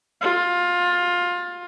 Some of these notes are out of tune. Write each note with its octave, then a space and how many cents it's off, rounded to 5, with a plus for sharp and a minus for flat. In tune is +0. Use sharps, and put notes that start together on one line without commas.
F4 +20